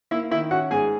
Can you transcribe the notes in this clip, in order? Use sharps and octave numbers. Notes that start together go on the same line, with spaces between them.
A#3 E4 E5
D#3 E4 E5
C#4 F#4 F#5
G#2 G#4 G#5